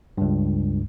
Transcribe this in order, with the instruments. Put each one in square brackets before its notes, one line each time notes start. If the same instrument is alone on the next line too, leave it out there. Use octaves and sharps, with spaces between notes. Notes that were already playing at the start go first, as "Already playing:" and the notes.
[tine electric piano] C#2 G2